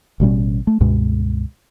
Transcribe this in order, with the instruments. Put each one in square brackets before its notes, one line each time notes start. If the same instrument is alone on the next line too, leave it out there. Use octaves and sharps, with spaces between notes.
[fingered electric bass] A1 B2 G3 C#4
A3
C#2 G2 B2 G#3